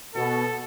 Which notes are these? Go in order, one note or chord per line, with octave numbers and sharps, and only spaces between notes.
B2 A4